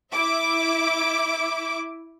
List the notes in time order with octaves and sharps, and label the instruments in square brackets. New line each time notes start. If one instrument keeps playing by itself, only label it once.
[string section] E4 E5 D6